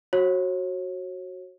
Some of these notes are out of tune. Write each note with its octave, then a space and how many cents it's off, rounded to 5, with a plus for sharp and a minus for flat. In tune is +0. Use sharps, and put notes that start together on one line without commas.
F#4 +0 C#5 -35